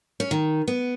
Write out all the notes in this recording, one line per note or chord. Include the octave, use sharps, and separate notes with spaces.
C#4
D#3
B3